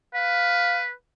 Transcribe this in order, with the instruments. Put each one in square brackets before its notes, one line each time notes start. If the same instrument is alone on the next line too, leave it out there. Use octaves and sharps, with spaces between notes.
[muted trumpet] B4 [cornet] F5